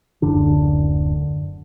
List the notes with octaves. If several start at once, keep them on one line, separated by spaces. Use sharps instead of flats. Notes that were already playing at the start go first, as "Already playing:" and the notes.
D1 F#2 D3 D4